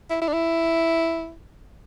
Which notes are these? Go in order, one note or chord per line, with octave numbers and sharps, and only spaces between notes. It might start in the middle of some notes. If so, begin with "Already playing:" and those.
E4
E4
D4
E4